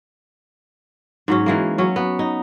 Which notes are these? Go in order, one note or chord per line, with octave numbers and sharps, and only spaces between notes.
G#2 F#3 C#4
E3 G#3 A#3
F#3 C#4
B3
D#4